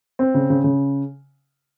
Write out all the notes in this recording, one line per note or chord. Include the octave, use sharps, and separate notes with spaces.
C4
C#3
C#3
C#3